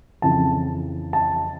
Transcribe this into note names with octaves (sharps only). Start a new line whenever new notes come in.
F2 C#3 E3 A5
A5